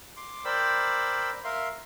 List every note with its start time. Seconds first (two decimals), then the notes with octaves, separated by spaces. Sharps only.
0.17 C6 D6
0.45 A#4 C5 D5 G5 B5 E6
1.44 A#4 E5 F5 C6